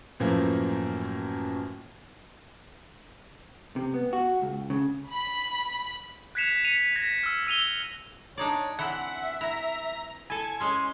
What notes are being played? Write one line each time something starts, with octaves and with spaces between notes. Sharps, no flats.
F#2 A2 E3 F3 A#3
C3
B3
F#4
C#2
C#3
B5
F#6 G#6 B6 C#7 E7 F7
B6 C#7 D#7 F7
G#6 A#6 B6
E6 F6
E6 D#7 F7 G7
D4 D#4 C#5 D5
E3 C4 E4 E5 F#5
E4 A#5
E4 A4 G#5
G#3 C#4 C6